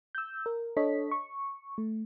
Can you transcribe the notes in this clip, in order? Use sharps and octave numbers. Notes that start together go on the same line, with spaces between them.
E6 G6
A#4
D4 A4 C#5 D#5 B6
C#6
A3